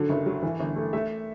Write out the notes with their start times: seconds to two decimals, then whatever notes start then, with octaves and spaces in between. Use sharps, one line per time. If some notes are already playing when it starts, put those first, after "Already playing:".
Already playing: D3 F#3 A4
0.09 F#1
0.26 F#3
0.43 E3
0.60 G1
0.76 A3
0.93 A3 E5